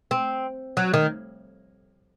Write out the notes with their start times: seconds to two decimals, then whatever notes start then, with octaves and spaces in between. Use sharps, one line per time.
0.11 C4
0.77 F#3
0.94 D#3